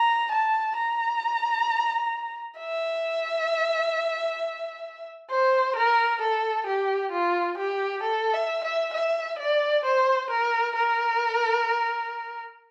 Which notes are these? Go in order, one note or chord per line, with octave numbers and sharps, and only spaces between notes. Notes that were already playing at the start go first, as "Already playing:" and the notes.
Already playing: A#5
A5
A#5
E5
C5
A#4
A4
G4
F4
G4
A4
E5
E5
E5
D5
C5
A#4
A#4